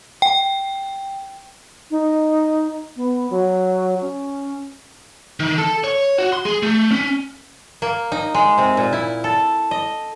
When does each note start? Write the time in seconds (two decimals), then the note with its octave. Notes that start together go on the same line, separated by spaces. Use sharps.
0.22 G5
1.91 D#4
2.96 B3
3.30 F#3
4.01 C#4
5.40 D#3
5.58 A4
5.84 C#5
6.18 F#4
6.33 C6
6.45 G#4
6.63 A3
6.91 C#4
7.82 A#3
8.12 D#4
8.34 G#3
8.58 C3
8.77 A#2
8.93 E4
9.24 A4
9.71 D#5